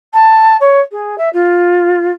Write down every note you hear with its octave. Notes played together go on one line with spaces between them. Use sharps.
A5
C#5
G#4
E5
F4